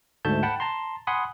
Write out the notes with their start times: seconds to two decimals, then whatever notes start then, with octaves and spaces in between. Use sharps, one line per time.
0.25 D2 G#2 A3 E5 A5 G6
0.43 F#5 G5 A5 B5
0.60 A5 A#5 C6
1.07 F#5 G#5 B5 C6 D#6